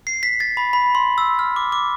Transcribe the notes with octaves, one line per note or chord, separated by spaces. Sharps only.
C7
B6
A6
B5
B5
C6
E6
F6
D6
D6